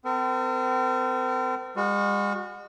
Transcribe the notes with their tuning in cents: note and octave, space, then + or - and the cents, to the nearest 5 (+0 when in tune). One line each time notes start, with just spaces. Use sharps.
C4 -40 A#4 -45
G#3 -45 F#4 -25